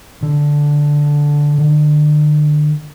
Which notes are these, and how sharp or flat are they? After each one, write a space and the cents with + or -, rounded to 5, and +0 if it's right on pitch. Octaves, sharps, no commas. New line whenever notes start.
D3 -5
D3 +35